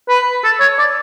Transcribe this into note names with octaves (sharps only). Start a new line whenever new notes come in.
B4
A4
C#5
D5